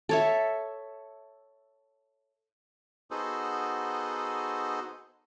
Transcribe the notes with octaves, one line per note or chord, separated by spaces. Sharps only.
A4 C#5 E5
B3 D#4 F#4 G#4 A4 C5